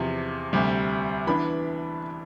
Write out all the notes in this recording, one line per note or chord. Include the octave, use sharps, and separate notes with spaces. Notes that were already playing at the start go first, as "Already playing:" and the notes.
Already playing: E2 C3 F3
D2 C3 G3
E3 B3 D4 B5